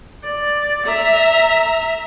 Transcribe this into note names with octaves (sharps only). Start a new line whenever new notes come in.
D5
E5 A#5